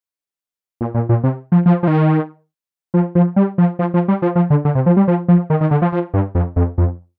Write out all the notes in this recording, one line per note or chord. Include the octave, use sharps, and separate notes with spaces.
A#2
A#2
A#2
C3
F3
F3
F3
D#3
F3
F3
G3
F3
F3
F3
G3
F3
F3
D3
D3
C3
F3
G3
F3
F3
D#3
D#3
D3
F3
F3
G2
F2
F2
F2